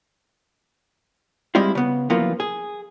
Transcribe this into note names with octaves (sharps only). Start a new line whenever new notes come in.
G3 G#3 C4 E4 F4
C#3 B3
F#2 E3 F3 A#3 B3 F4
G#4